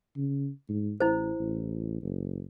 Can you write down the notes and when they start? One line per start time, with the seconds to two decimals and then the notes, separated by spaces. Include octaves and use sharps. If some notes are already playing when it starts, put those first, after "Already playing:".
0.17 C#3
0.69 G#2
1.00 A1 E4 C5
1.39 A1
2.02 F#1